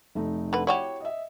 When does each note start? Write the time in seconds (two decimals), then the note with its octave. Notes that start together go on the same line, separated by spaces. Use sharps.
0.15 F1 A3 D#4
0.53 D3 B4
0.67 E4 F#4 G4 C#5
1.01 D#5 E5